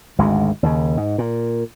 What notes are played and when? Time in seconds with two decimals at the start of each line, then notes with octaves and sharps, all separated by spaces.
0.18 G#1 D2 G#3
0.63 D#2 C#3
0.97 G#2
1.18 A#2